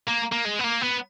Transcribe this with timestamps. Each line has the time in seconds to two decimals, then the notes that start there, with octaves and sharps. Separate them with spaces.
0.08 A#3
0.32 A#3
0.45 G#3
0.59 B3
0.64 A#3
0.81 B3